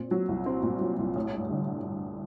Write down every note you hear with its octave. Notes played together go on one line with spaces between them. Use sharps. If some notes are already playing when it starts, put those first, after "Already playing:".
Already playing: A#2 C4
F#3
C2
C4
A#2
F#3
C2
A1
G2
D3